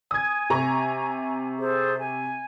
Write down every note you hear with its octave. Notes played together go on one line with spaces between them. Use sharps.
G#5 D#6 G#6
C3 A#5 C#6
G#4 A4 C5
G#5